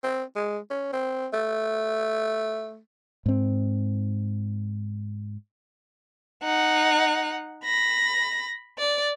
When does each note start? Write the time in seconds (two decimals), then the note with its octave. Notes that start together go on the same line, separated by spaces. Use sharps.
0.04 C4
0.36 G#3
0.70 C#4
0.93 C4
1.34 A3
3.26 G#2 C4
6.43 D#4 F#5
7.64 B5 A#6
8.78 D5